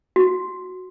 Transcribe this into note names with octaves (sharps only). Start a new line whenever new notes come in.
F#4